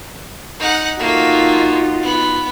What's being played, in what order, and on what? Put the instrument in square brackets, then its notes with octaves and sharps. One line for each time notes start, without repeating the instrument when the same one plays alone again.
[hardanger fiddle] D#4 F#5
[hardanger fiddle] A3 A#3 [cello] D#4 F4 [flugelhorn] F#4
[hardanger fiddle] B3